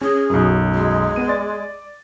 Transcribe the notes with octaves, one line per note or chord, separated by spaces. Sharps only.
C#4 G#4
B1 F#2
G#3
B3 D#7
D5 A6